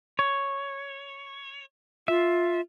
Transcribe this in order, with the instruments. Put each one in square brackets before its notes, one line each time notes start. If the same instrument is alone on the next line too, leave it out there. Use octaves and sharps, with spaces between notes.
[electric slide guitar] C#5
[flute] F4 [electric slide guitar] E5